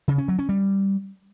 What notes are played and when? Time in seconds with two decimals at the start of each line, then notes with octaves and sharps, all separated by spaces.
0.08 C#3
0.18 C#4
0.28 F#3
0.39 C#4
0.49 G3